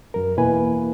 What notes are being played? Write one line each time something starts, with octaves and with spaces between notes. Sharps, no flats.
F#2 A#4
E2 B2 A#3 E4 B4 G#5